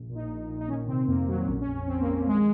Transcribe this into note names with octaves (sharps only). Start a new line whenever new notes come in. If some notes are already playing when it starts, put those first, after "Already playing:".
Already playing: A#1
A#2
D#4
A#1
A#2
D#4
D#3 C#4
C3 C4
F2 A#3
F2 F#3
A#1 C#4
C#4
A#1
A#1 C4
A#3
A#1
A#3
D#2 G#3